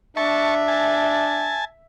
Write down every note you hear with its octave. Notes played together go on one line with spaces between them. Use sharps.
D4 E5 A5 C#6
G#5 A5